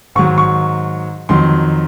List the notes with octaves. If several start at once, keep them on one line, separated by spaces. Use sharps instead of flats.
G#2 D#3 F#3 C#6
C#6
F2 D#3 F#3 C6